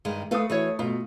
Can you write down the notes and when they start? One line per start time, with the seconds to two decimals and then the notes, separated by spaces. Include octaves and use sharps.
0.05 G2 D#3 G#3
0.31 A3 A4 B4 F5 D#6
0.50 E3 F#4 C#5
0.79 B2 A3 F4